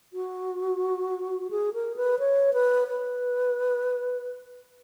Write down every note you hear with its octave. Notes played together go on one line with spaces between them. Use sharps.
F#4
G#4
A#4
B4
C#5
B4
B4